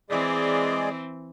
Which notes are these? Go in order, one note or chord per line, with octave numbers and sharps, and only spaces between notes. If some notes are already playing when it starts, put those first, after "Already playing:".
E3 G#3 C4 G#4 D5